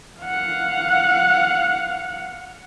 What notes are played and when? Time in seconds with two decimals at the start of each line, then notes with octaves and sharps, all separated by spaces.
0.21 F5 F#5